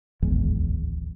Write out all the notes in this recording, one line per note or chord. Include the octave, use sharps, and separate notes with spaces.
D1 G#1 E2 G#3